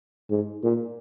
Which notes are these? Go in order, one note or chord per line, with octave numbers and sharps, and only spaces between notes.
G#2
A#2